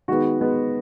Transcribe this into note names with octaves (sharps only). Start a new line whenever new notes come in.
D#3 G#3 B3 F#4
D#3 G#3 B3